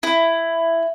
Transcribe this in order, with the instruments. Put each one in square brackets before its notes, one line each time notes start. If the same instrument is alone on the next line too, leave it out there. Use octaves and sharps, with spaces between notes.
[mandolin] E4